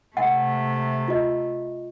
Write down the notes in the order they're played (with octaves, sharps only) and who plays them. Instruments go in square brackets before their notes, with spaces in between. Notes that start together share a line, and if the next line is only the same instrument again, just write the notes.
[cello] C3 A3 [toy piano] F#5
[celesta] F4 D#5